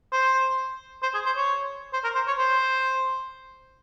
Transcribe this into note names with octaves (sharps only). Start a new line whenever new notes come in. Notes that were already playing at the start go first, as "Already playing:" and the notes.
C5
C5
G#4
C5
C#5
C5
A#4
C5
C#5
C5